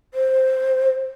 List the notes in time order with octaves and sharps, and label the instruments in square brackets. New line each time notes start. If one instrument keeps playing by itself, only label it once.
[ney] C5